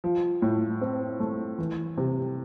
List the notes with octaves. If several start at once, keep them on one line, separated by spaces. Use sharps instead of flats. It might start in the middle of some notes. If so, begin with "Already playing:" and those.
F3
A2
C4
A3
E3
C3